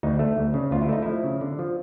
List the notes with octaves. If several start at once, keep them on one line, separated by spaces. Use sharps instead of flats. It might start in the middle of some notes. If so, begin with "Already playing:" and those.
D2 D#4
A3
D2
C#3
D2 F4
E4
A3 D#4
F3 E4
C#3
D3
F3